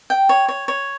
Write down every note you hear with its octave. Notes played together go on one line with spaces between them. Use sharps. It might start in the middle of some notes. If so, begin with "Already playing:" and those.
G5
C#5
C#5
C#5